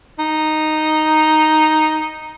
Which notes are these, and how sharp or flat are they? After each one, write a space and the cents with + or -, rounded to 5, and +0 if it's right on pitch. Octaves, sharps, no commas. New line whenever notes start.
D#4 -5